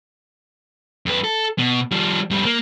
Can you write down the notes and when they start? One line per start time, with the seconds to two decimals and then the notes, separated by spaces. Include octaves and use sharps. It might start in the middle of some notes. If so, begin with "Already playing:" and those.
1.06 F2 B4
1.24 A4
1.59 B2
1.92 F3 G3
2.31 F2 G3
2.45 A#3